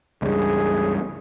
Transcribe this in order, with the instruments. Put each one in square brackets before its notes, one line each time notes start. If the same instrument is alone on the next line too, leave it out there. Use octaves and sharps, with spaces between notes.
[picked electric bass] C#2 G2 [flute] G#4